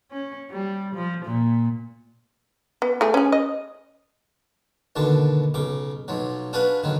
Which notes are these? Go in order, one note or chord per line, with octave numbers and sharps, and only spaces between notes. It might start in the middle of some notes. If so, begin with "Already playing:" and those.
C#4
G3
F3
A#2
B3
A3 G#4
C#4 G#4
D#5
D#2 B2 D3 A5
B1 C#3 D6
B1 F3 F#3
D4 F4 F#4 G#4 B4
D3 D#3 F#3